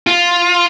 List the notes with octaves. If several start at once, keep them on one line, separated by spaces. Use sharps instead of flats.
F4